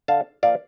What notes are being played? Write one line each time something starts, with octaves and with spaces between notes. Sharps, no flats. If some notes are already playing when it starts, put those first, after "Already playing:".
D3 F5 A5
F3 A#3 D5 F5